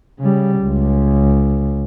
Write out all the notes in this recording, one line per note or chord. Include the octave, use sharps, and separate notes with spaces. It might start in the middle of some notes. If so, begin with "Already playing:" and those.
C#3 G3
C#2